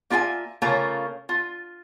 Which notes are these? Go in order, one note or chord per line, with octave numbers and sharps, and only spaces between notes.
A#3 F4 E5 G5 G#5
C#3 A3 A#3 C#4 F4 A#5
F4